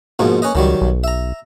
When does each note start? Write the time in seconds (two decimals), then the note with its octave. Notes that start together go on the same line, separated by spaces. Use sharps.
0.19 G#2 B2 F3 A#3
0.42 C#4 B4 D#5
0.55 C#2 D#3 F#3 G3
0.81 B1
1.04 E5 A#5